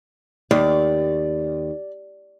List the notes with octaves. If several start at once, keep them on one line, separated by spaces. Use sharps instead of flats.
D#2 D5